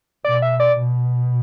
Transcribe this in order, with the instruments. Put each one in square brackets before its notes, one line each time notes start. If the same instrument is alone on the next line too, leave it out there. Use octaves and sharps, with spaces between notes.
[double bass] B2 [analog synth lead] D5
[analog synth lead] E5
D5
[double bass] B2